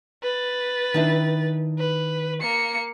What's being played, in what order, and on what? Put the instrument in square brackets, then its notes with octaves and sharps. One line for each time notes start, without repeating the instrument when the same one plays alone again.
[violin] B4 A6
[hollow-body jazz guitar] D#3 D4 E4
[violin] B4
A#3 C#7